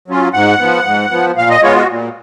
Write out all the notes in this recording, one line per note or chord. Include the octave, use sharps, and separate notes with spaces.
F#3 C#4 F4
G#2 F#5
F3 B3
G#2
F3 B3
A#2 F5
D#5
G#3 B3 F4 C#5
F#4
A#2